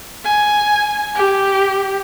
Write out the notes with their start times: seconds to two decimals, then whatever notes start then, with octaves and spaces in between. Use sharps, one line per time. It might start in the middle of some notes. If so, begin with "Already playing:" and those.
0.25 G#5
1.15 G4